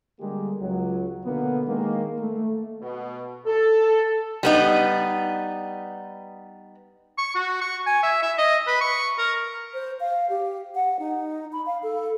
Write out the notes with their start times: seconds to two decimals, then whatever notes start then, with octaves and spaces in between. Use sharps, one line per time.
0.20 D3 G3 G#3 A#3 G4
0.61 C#2 F#3
1.24 B2 D3 A#3 B3
1.67 D#3 G#3 A#3
2.18 A3
2.81 B2
3.47 A4
4.43 G3 B3 D#4
7.18 C#6
7.35 F#4
7.61 C#6
7.86 G#5
8.03 E5
8.22 E5
8.38 D#5
8.67 B4
8.81 C#6
9.18 A#4
9.74 C5
10.00 F5
10.30 G4
10.75 F#5
10.99 D#4
11.53 B5
11.66 F5
11.83 A4